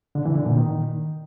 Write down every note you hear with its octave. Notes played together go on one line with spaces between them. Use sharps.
D3
E3
D3
A#2
D#3